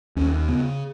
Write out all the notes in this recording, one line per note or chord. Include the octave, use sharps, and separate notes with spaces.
D#2 C#4
C#3 B3